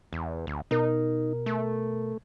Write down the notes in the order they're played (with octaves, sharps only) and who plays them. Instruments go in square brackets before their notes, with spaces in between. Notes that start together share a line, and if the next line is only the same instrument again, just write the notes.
[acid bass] E2
D2
[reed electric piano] B2 A#4 [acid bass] D#4
[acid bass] A3